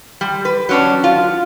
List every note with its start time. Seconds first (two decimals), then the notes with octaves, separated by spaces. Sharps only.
0.21 G3
0.45 B4
0.69 F#3 C#4 D4
1.04 F4